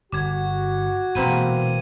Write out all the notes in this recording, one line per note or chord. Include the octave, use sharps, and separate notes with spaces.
G1 F#4 D6 G#6
E1 E2 A#2 A#3 C4 B4 D#7